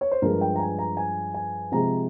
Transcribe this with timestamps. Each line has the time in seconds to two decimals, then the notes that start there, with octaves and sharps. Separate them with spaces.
0.01 C#5
0.12 C5
0.22 G2 F3 G#3 A#4
0.41 G5
0.56 A#5
0.60 G#5
0.79 A#5
0.97 G#5
1.34 G#5
1.72 C3 F3 G#3 A#5